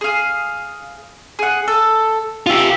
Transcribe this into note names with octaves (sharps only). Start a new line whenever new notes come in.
G#4 F5
G#4 F#5
A4
D#4 F4 G4 E5